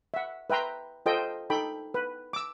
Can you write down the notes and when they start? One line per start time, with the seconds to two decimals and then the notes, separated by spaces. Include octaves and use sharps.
0.14 E5 F#5
0.50 B4 E5 G5 A#5 C6
1.06 F4 A4 C5 D#5 G5
1.50 D#4 A4 G5 B5
1.94 B4
2.33 D6 E6